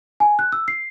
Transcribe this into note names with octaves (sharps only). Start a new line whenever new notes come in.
G#5
F#6
E6
C7